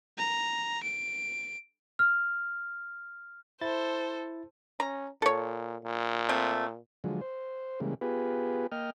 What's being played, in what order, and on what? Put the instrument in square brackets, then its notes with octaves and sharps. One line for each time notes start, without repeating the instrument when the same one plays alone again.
[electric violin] A#5
D7
[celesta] F6
[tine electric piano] E4 A6 [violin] A4 C5
[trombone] C#4 [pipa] A#5
[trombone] A#2 [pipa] A4 C#5
[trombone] A#2
[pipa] A3 C4
[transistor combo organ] D3 F3 F#3 G#3
C5
C#3 E3 G3 G#3 A#3
B3 F4 G4 G#4 B4
A#3 D#5 G5 F6